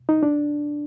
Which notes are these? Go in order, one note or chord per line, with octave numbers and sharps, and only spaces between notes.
D#4
D4